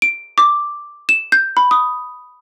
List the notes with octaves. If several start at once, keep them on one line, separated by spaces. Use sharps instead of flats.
D7
D6
E7
G6
B5
D#6